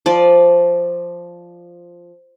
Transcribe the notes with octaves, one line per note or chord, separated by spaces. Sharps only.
F3 D5